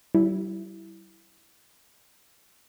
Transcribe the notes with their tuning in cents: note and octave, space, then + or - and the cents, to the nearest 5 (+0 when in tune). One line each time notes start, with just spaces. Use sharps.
G3 -35 E4 +0